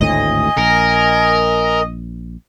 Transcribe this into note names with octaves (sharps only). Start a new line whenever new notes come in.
G#1 D2 A2 D#5 G#5
A#1 A#4